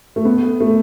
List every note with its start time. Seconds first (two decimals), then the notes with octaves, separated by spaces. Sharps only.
0.16 A3
0.25 B3
0.61 A3